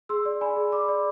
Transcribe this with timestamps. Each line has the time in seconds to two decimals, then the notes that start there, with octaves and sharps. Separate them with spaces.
0.09 G#4 C6 E6
0.25 D5
0.41 D5 G#5 B5
0.57 G#4
0.72 D5 B5 D6
0.88 D5